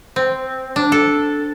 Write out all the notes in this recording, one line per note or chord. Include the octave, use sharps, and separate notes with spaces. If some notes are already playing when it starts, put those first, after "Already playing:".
C4
D4
A4